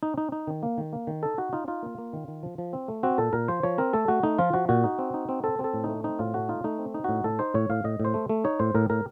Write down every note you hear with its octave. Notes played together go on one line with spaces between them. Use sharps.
D#4
D#4
D#4
D#3
A#3
D#3
A#3
D#3
D#4 A4
D#4 F#4
D#4 F4
D#4 F4
A#3
A#3
D#3
D#3
F3
F3
C4
A3
C4 F#4
A#2 A4
A#2 A#4
F3 C5
F3 C#5
C4 A#4
A3 A4
A3 F#4
A3 D#4
F3 F4
F3 F#4
A#2 F#4
D#4
C4
D#4
C4
C4 A4
C4
A4
A2
A3 D#4
C4 D#4
A2 F4
A3 F#4
D#4 F4
A3 D#4
C4
D#4
A2 F#4
A2 A4
D#4 C5
A2 C#5
A2 F5
A2 D#5
A2 C5
A3
A3
D#4 C#5
A2 C5
A2 A#4
A2 A#4